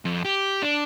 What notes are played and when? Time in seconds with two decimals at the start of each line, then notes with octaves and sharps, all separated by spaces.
0.05 F2
0.25 G4
0.62 D4